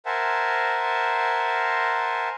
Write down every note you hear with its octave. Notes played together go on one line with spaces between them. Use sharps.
A#4 C5 E5 F#5 G#5 A5